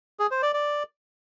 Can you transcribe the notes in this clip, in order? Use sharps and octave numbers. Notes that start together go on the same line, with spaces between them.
G#4
C5
D5
D5